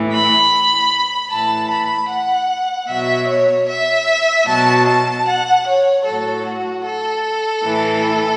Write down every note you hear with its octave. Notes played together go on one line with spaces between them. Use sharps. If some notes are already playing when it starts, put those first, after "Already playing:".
Already playing: A2 E3
B5
A2 E3 A5
B5
F#5
B2 F#3 E5
C#5
E5
B2 F#3 A5
A5
F#5
C#5
A2 F#3 A4
F#4
A4
A2 E3